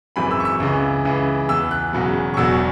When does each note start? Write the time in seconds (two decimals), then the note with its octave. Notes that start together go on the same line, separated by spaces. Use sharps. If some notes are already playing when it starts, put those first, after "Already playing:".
0.16 G#1 F#2 C#3 E3 B5
0.31 E6
0.40 C#6
0.45 E6
0.60 C#2 C#3 E3
1.05 C#2 C#3 E3
1.49 E2 E3 E6
1.71 F#6
1.93 E1 E2 C#3 F#3
2.34 C#6
2.37 E1 E2 B2 F#3 E6